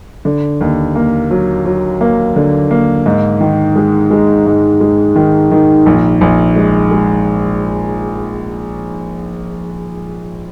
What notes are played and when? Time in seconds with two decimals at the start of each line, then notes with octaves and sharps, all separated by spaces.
0.25 D3
0.61 D#2
0.95 A#3
1.31 F#3
1.65 F#3
2.01 A#3
2.36 D3
2.71 A#3
3.06 G#2
3.41 D#3
3.76 G#3
4.10 G#3
4.46 G#2
4.81 G#3
5.16 D#3
5.51 D#3
5.86 A#1
6.21 A#1
6.56 G#3
6.91 G#3